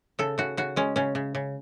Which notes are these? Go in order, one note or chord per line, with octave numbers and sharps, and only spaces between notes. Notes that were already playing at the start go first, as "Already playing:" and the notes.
C#3 A4
C#3 F#4
C#3 F#4
G#3 C#4
C#3 C#4
C#3
C#3